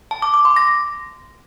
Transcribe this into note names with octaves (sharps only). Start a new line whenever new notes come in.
A5
D6
D6
C6
A#6